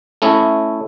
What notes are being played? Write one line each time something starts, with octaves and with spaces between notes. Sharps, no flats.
A3 C#4 E4